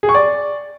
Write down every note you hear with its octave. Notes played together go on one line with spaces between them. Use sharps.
G#4
C#6
D5